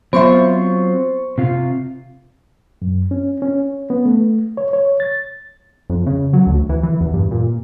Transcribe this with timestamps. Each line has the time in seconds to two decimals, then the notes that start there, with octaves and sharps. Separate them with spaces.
0.13 F#3 B3 C4 F4 C5 E5 C#6
1.38 C3 F4
2.82 F#2
3.11 C#4
3.42 C#4
3.90 B3
4.06 A3
4.57 C#5
4.73 C#5
5.00 A6
5.90 F2
6.06 C#3
6.33 F#3
6.47 D2
6.69 E3
6.83 E3
7.01 E2
7.14 G2
7.31 A#2